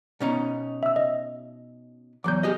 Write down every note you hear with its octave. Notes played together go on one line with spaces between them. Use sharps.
B2 C#4 D#4
E5 E6
D#5
E2 F#3 D6 G6
G4 G#4 D#5